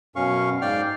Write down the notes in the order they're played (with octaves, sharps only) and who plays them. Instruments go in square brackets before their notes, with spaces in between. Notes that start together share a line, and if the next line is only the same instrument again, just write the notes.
[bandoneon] F#2 B2 C#4 F5 C#6
G#2 D5 F5 G5 F6